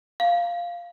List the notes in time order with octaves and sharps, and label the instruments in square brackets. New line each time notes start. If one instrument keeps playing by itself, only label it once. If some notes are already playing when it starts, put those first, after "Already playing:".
[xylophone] F5